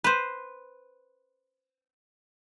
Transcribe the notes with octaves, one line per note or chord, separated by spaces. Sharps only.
B4 C5